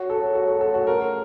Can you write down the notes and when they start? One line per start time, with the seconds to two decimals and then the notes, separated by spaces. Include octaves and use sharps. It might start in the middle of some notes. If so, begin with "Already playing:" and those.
Already playing: F#2 F#4
0.09 C#3 F#3 A4
0.35 A2 F#4
0.48 A4
0.61 A3 C#4 F4 A4
0.74 F#4
0.87 C#3 A#4